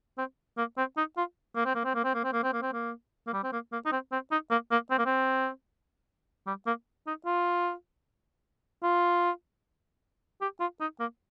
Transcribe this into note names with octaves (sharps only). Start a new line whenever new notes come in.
C4
A#3
C4
D#4
F4
A#3
C4
A#3
C4
A#3
C4
A#3
C4
A#3
C4
A#3
C4
A#3
A#3
G3
C4
A#3
A#3
D#4
C4
C4
D#4
A#3
A#3
C4
A#3
C4
G3
A#3
D#4
F4
F4
G4
F4
D#4
A#3